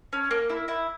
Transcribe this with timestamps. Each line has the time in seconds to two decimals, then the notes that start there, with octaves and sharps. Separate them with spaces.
0.13 C#4
0.31 A#3
0.50 E4
0.68 E4